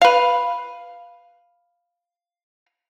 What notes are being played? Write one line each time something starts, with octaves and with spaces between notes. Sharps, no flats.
B4 F5